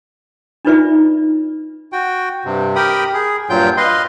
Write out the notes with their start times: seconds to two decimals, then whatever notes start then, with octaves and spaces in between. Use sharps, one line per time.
0.65 D4 D#4 F4 B4 D5 E5
1.93 F#4 G5
2.45 G2 C3
2.76 G4 A#4 G5 B5 D#6
3.14 G#4
3.50 G2 A#2 F#3 F4 G5 G6
3.77 B4 D#5 F5 C6